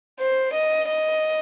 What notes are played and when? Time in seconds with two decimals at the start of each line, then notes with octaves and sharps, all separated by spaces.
0.21 C5
0.55 D#5
0.90 D#5